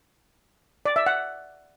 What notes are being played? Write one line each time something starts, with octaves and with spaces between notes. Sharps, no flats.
D5
E5
F#5